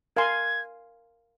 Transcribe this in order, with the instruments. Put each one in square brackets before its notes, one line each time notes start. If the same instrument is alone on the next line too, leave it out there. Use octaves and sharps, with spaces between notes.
[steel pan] A#4 F5 G#5 C6 [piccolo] G#6